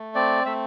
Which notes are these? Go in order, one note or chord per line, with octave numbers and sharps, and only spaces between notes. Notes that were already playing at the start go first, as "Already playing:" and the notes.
Already playing: A3
C4 D5
A3 E5